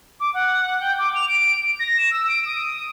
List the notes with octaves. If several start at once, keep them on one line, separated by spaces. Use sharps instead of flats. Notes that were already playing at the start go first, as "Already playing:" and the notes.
D6
F#5
G5
D6
F7
D7
A#6
E7
E6
D7
D#6